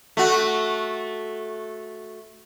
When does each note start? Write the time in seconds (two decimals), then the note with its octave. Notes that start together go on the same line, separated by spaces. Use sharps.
0.17 A3 F#4